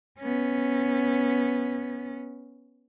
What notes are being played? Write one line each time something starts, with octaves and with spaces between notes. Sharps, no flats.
B3 C#4